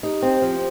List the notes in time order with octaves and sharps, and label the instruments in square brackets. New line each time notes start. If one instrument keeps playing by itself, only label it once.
[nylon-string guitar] D#4 [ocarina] G4
[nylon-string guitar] C4
F3